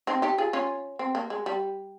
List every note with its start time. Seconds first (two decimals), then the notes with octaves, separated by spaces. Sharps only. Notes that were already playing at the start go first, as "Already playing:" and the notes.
0.07 C4 D#4
0.22 D#4 G4
0.38 F4 G#4
0.53 C#4 F4
0.99 C4
1.15 A#3
1.30 G#3
1.46 G3